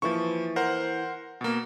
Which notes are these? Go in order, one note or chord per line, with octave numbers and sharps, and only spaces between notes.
E3 F3 A#3 E4 C#6
A#4 C5 F#5
B2 A#3